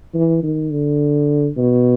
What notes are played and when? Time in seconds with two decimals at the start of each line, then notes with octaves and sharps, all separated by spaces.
0.14 E3
0.43 D#3
0.72 D3
1.57 B2